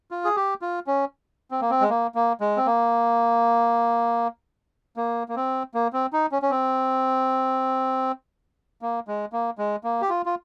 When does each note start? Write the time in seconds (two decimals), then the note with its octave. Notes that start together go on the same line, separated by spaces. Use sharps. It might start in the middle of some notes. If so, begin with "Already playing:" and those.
0.11 F4
0.25 G#4
0.36 G4
0.62 F4
0.87 C#4
1.51 C4
1.61 A#3
1.70 C4
1.81 G#3
1.89 A#3
2.15 A#3
2.41 G#3
2.57 C4
2.66 A#3
4.97 A#3
5.29 A#3
5.36 C4
5.74 A#3
5.93 C4
6.13 D#4
6.32 C#4
6.42 C#4
6.50 C4
8.82 A#3
9.08 G#3
9.33 A#3
9.58 G#3
9.84 A#3
10.01 G4
10.09 F4
10.26 F4